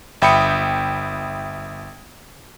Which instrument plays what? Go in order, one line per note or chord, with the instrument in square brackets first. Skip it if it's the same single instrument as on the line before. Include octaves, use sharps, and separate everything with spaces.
[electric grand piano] G1 E5 G5 B5 D#6 C#7